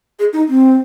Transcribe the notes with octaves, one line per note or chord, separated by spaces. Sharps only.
G#4
D#4
C4